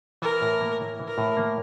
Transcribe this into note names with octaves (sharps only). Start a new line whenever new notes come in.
E3 A#4
A2
A#3
E4
E3
A#4
A2
A#3